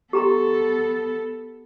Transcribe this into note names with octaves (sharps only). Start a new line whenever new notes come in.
B3 G4 A4 A#5 C6